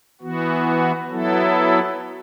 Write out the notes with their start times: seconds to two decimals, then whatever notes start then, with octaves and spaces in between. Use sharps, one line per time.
0.21 E3 B3 F#4
1.10 F#3 B3 E4 A4